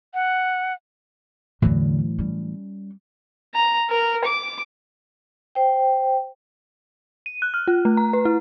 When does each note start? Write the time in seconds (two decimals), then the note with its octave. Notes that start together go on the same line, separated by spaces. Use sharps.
0.14 F#5
1.62 E2 A2 D3 E3 F#3
2.19 G3 C#4
3.54 A#5
3.90 A#4
4.25 D6
5.55 C5 G5
7.26 D#7
7.42 F#6
7.54 F6
7.68 F4
7.85 A3
7.97 A#5
8.13 B4
8.25 E4